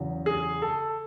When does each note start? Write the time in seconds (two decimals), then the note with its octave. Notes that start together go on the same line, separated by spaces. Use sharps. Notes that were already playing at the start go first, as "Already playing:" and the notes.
Already playing: E2 C#3 F#3
0.26 G#4
0.62 A4